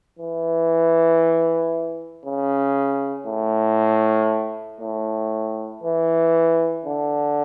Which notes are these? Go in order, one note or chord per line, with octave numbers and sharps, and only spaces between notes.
E3
C#3
A2
A2
E3
D3